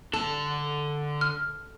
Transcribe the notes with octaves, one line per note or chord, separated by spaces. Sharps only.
D3 A4 A5
F6